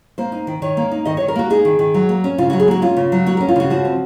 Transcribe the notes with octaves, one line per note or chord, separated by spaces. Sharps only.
A#3 C5
D#4
D#3
D#3 C#5
A#3
D#4
D#3 D#5
C#5
D#3
A#4
A#3 F#4
D#4 G#4
D#3
D#3
F#3
A#3
C#4
C#3 F4
F#4
F#3
G#4
A#3 F#4
C#4 F4
C#3
F#3
A#3 F#4
A#4
C#4
F4
C#3 F#4
F3 F#4
C4